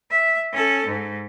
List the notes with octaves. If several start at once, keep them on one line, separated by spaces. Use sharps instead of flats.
E5
C#4 A4
G#2